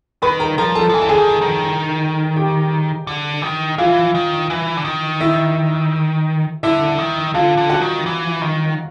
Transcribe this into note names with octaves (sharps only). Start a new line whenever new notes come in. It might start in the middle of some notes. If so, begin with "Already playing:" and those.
D#3 B4 B5
A#4 A#5
F3 A#4 A#5
A4 A5
F3
E3 G#5
A5
D3 G#4 G#5
D#3
D#3
G4 G5
D3
D#3
E3 F4 F5
D#3
E3
D3
D#3
E4 E5
D3 E4 E5
D#3
D3 F4 F5
D3
F#4 F#5
D#3
E3
D#3